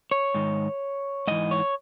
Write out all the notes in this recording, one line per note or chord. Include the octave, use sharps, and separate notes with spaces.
C#5
G#2 D#3
G#2 E3 D#5
C#5